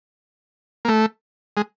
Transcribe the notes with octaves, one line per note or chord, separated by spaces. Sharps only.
A#3
A3
G#3